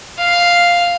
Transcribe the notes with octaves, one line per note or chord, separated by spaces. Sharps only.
F5